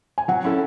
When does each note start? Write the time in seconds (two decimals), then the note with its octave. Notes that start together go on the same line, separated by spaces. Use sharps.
0.18 G#5
0.28 F#3 F#5
0.44 C#4 E4 A4